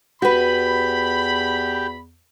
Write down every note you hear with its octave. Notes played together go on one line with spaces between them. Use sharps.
E2 F#4 G4 B4 B5